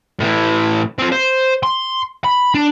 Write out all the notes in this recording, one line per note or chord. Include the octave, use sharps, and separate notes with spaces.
A2 E3
C4 F4
C5
C6
B5
D4